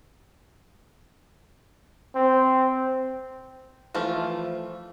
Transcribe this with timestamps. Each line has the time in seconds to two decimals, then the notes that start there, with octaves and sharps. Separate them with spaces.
2.15 C4
3.95 E3 F3 A3 F4